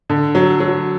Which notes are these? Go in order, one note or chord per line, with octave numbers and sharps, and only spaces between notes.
D3
F#3
F#3